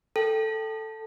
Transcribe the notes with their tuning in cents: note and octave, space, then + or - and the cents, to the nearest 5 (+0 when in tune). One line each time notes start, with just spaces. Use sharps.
A4 +0 G5 +0